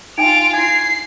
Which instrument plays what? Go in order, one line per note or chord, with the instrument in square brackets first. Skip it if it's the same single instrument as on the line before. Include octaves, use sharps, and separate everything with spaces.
[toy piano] D#4 G5 G#5 [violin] F4 F7 [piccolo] D7
[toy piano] E4 G#5 [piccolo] G#6 [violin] C7